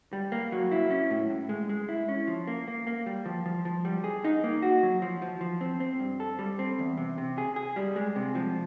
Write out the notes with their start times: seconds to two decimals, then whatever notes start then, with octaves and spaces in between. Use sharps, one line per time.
0.13 G3
0.32 A#3
0.52 F#3
0.71 E4
0.90 C#4
1.11 A2
1.30 A2
1.49 G#3
1.69 G#3
1.89 E4
2.09 C#4
2.27 F3
2.47 A#3
2.68 A#3
2.87 A#3
3.06 G3
3.26 F3
3.46 F3
3.65 F3
3.85 G3
4.04 G#4
4.24 D#4
4.44 A#3
4.62 F#4
4.83 F#3
5.02 F3
5.22 F3
5.41 F3
5.61 C4
5.80 C4
6.00 G2
6.20 A4
6.39 G3
6.59 C4
6.79 E2
6.97 C3
7.18 C3
7.38 G#4
7.56 G#4
7.76 G3
7.96 G#3
8.16 C3
8.35 F3